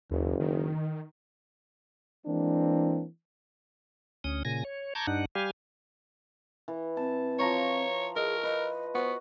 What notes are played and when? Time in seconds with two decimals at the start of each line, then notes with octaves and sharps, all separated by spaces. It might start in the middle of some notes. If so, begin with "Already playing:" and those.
0.11 F#1 D#2
0.40 D#3
2.26 E3 G#3 A#3 C4 D4
4.24 D2 C#4 D#6
4.45 A#2 C#3 G#5 A#6
4.65 C#5
4.95 A5 A#5 C#6 D6 G6 G#6
5.07 G2 D4 D#4 F#5
5.35 G3 G4 F5 G#5
6.68 E3
6.97 C4 A5
7.39 F3 C#5 A#5 C#6
8.16 G#4 A#4 D#5
8.43 B4 D#5
8.95 B3 F#4 C5